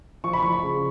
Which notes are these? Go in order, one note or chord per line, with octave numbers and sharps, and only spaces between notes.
F3 C#6
B5
F3 C#6
B5
C#3